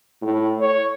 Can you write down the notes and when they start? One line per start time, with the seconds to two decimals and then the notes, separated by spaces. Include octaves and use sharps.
0.22 A2
0.61 C#5